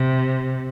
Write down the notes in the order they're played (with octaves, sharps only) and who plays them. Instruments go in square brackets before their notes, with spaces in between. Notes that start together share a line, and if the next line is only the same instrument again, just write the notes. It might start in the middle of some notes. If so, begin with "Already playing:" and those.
Already playing: [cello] C3